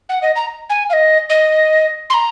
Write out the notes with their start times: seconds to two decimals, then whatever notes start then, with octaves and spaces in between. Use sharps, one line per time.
0.09 F#5
0.22 D#5
0.36 A#5
0.70 G#5
0.90 F5
0.93 D#5
1.30 D#5
2.10 C6
2.14 A#5